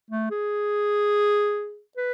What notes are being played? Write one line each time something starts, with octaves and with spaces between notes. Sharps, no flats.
A3
G#4
B4